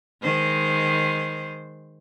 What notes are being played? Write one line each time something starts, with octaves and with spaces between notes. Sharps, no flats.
D#3 G#3 C5